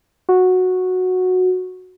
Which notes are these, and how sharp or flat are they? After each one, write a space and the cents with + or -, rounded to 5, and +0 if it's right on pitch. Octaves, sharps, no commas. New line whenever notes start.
F#4 -10